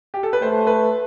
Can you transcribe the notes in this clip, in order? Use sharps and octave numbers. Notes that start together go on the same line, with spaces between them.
G4
A4
B4
A3 C5
B4